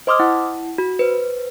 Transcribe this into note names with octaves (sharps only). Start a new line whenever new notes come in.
C5 D#5 C6 D6 D#6 F6
E4 F#5
F#4
B4 C5